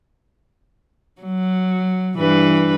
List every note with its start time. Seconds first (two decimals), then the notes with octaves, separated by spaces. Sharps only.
1.22 F#3
2.17 G2 E3 B4